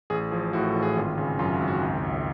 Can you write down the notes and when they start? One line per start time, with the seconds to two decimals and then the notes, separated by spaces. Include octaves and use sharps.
0.10 A1 G#4
0.31 F3 G#4
0.53 A2 F#4
0.67 A4
0.75 A1
0.83 G#4
0.97 G#1 F4
1.18 C#3
1.39 F#2 F4
1.54 F#4
1.60 G#1
1.68 F#4
1.82 C#2
2.03 C#2